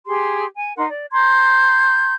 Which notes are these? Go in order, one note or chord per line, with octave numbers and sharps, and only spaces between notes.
G4 G#4 C6
G#5
D#4 A#4 F#5 C6
D5
A#5 C6 G6 G#6